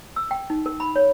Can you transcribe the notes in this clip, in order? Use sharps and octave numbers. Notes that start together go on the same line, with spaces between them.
E6
G5
D#4
A#4
B5
C#5